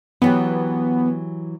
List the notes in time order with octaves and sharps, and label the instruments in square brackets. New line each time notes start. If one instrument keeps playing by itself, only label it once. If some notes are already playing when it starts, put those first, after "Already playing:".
[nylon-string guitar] E3 F#3 G4 [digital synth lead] B3